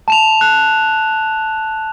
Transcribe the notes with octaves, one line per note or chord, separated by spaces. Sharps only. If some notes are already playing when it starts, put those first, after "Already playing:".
A5 E7 F7
F#6